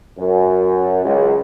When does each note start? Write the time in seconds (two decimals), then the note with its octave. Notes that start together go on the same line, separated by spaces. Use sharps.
0.19 F#2
1.05 C#2